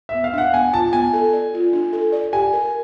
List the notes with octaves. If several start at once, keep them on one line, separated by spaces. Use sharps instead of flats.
E5
B3
F5
D4 F#5
B3 G#5
F4 A5
B3 G#5
A4
D5
F4
D4
A4
D5
G4 G#5
A#4